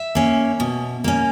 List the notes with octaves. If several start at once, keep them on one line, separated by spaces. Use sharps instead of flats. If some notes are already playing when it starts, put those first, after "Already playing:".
Already playing: E5
A#3 C#4
B2
A#3 C#4